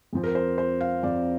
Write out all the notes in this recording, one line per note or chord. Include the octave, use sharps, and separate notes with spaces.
F2 F3 C4
A#4
C5
C5
F5
F2 F3 C4 D5